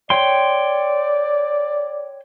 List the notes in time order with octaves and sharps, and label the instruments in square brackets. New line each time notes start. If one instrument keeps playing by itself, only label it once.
[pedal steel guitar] C#5 G5 C6 [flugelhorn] D5